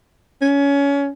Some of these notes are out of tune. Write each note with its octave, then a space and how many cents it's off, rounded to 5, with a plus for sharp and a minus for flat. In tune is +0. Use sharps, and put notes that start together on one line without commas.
C#4 +25